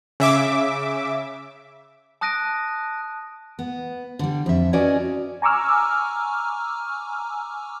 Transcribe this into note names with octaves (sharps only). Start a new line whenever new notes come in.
C#3 E5 D6
A5 D#6 F#6 A#6 D7 D#7
B3
D3 G3
F2 E5
C#4 F#4 B4 D5 D#5 G#5
G#5 A#5 C#6 D6 E6 F6